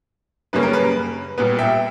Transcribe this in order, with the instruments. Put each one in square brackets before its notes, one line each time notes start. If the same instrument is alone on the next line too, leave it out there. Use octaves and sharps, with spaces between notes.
[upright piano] F#2 C#3 G3 A#3 C#4 B4
A#4
B4
A#2 G3 B3 B4
E5 G5